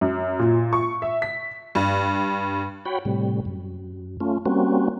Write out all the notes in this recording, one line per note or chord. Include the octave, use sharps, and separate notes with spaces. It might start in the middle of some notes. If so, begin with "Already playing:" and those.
F#2
A#2
C#6
E5
B6
G2
F#4 C#5 G5 B5
A2 C3 G3
F#2
A3 C#4 F4
G3 A#3 C4 C#4 F#4